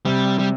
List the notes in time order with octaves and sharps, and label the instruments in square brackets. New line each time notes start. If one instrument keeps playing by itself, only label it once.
[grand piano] C3 [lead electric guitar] G3
[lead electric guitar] G3